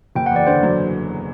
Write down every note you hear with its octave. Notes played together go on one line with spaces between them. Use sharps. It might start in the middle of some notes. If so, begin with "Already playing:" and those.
F#1 G5
F#5
E2 D5
D3 C5
F#3